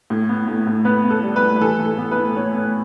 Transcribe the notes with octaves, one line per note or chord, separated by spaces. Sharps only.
A2
B3
A2
A2
B3 B4
B3
A4
G3
B4
A2
B4
E3 A4
A2
A4
B3
B4
A2
A2 C#5
B3